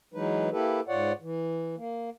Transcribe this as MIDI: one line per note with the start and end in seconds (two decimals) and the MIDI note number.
0.14 0.50 52
0.14 0.50 54
0.14 0.50 56
0.14 0.50 63
0.14 0.50 71
0.52 0.81 58
0.52 0.81 64
0.52 0.81 67
0.52 0.81 69
0.52 0.81 71
0.88 1.12 44
0.88 1.12 65
0.88 1.12 73
0.88 1.12 74
0.88 1.12 78
1.21 1.76 52
1.77 2.10 58